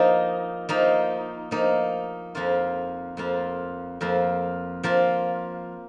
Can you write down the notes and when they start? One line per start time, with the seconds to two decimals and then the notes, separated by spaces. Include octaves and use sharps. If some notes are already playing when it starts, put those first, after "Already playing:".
Already playing: F3 A#3 D#4
0.69 F3 A#3 D#4
1.51 F3 A#3 D#4
2.35 F2 F3 A#3 F4
3.17 F2 F3 A#3 F4
4.01 F2 F3 A#3 F4
4.83 F3 A#3 F4